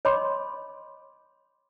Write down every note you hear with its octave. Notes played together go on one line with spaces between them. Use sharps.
C#5 D#5 B5 C6 D6